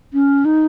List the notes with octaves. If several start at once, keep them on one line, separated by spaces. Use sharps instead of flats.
C#4
D#4